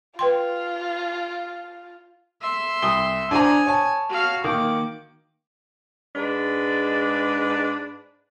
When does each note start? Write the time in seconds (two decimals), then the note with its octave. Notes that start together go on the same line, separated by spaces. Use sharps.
0.19 F4 B4 G5 C6
2.41 E5 C6
2.82 C2 D#6 G7
3.31 D4 C5 G#5 A#5
3.66 C#5 A5
4.10 F#4 F5
4.44 D#3 A#3 D6
6.16 G#2 G#3 D4 B4